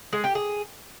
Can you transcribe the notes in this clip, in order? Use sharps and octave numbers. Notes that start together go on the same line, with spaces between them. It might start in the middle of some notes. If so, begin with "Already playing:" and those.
G#3
G4
G#4